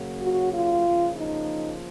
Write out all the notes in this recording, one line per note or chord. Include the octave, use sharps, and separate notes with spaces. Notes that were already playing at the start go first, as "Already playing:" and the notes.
Already playing: C#3 F#3 A#3
F#4
F4
C#3 F3 A#3
D#4